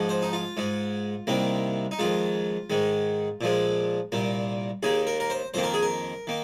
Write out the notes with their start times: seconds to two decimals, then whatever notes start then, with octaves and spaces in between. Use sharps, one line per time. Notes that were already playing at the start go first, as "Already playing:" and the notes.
Already playing: G#2 F3 G#3
0.09 C5
0.22 D#4
0.33 F4
0.57 G#2 G#3
1.27 C2 C3 D#3 A#3
1.91 D#4
1.99 F2 D#3 G#3 F4
2.70 G#2 D#3 G#3
3.41 A#2 F3 G#3
4.12 C2 A#2 A#3
4.83 D#2 D#3 A#3 G#4
5.07 A#4
5.20 A#4
5.30 C5
5.54 F2 D#3 A#3 C5
5.64 A#4
5.74 G#4
5.82 A#4
6.27 D#3 A#3